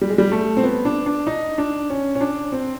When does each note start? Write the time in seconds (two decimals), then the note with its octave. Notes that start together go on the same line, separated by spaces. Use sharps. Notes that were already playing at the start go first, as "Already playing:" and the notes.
0.01 G3
0.09 G#3
0.18 G3
0.32 A3
0.57 C4
0.63 B3
0.85 D4
1.06 D4
1.27 D#4
1.58 D4
1.90 C#4
2.15 C#4
2.21 D4
2.52 C4